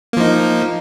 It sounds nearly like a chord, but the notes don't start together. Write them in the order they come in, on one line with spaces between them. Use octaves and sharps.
A#3 F3 D#4